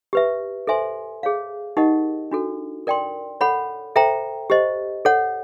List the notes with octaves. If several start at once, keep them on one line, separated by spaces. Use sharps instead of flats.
G4 B4 E5
A4 C5 E5 G#5 C6
G#4 C#5 F5
D#4 G4 A#4 D#5 F#5
D4 F#4 A4
A#4 D5 G5 C6
A4 C#5 F#5 B5
A4 C5 E5 G5 A#5
G4 C5 D#5
A4 C#5 F#5